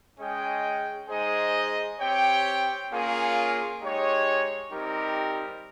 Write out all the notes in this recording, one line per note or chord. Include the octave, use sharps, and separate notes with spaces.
G#3 C#4 G#4 D#5 G5
G#3 D#4 G#4 C5 D#5
C4 G4 C#5 G5
A#3 C#4 F4 G#4 C#5
G#3 D#4 G4 C#5
G3 C4 D#4 G4 A#4